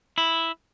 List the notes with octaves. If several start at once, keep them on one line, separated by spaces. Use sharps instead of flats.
E4